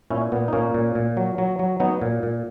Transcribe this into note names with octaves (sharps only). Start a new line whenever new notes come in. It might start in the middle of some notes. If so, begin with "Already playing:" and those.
A#2 C#4 E4
A#2 B3
D#4
A#2 A#3 C#4
A#2
A#2
F#3
F#3
F#3
F#3 B3 D#4
A#2
A#2